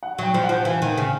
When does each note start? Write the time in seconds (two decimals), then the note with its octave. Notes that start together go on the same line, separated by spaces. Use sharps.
0.03 F#5
0.18 F#3 G5
0.34 F3
0.44 F#5
0.49 F3
0.65 E3 F5
0.82 D#3
0.98 C#3